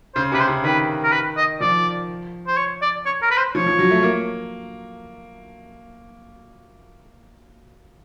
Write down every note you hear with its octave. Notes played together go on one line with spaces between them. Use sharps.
C#3 C5
C3 B4
C5
C#3
D#3 B4
A#4
B4
D#5
F3 D5
C5
C#5
D5
C#5
A#4
B4
C5
F3 C#5
F3
F#3
A3
A#3